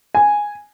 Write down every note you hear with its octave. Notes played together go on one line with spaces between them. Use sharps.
G#5